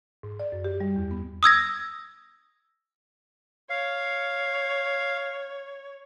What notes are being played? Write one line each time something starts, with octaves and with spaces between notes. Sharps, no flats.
G#2
D5
F#2
G4
G3
E2
B3
D#6 E6 G#6 A#6
C#5 F5